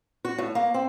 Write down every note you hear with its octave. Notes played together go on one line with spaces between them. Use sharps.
F#4
A2
A#3
C4